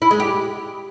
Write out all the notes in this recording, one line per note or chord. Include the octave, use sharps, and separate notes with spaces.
E4
G#3
G4